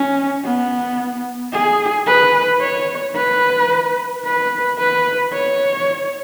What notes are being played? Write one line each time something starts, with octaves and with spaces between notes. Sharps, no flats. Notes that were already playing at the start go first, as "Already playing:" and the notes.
Already playing: C#4
B3
G#4
B4
C#5
B4
B4
B4
C#5